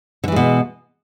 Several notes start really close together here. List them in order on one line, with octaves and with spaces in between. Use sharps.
D3 E3 G#3 B2